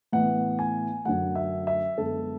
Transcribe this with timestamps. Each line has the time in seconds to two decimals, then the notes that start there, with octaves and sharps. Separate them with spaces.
0.12 A2 E3 B3 F#5
0.59 G#5
1.05 F#2 D3 F#3 A3 F#5
1.35 E5
1.67 E5
1.98 F#2 D3 G#3 B3 A4